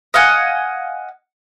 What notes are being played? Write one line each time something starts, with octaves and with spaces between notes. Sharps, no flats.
D#5 F5 F#5 G#5